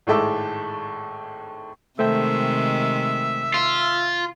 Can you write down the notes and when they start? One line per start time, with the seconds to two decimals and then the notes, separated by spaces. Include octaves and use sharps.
0.07 G#1 A2 G#3 A4 E5 D6
1.99 C3 D#3 G#3 A3 C5 E5 G5
3.54 F4